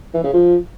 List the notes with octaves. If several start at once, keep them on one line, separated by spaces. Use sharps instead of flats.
E3
C#3
F3